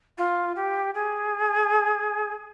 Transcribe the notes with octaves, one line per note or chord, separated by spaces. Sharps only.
F4
G4
G#4